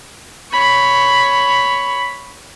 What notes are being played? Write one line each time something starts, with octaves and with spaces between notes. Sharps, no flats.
C#5 B5